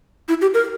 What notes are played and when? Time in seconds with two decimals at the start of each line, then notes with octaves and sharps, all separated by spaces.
0.29 E4
0.41 G4
0.54 A#4